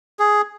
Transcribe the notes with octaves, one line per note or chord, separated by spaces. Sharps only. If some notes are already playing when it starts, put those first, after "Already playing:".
G#4